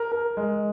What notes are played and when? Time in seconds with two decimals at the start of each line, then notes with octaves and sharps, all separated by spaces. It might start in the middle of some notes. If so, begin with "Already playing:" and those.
Already playing: A#4
0.12 A#4
0.37 G#3